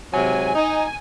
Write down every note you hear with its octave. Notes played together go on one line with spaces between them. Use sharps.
G#2 C3 F#3 G#5
D#4